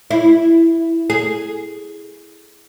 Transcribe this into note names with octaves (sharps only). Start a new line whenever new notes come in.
E4
G#4